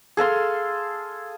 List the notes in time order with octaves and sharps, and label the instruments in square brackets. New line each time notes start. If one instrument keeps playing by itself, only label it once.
[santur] G#4 A4 F5 C6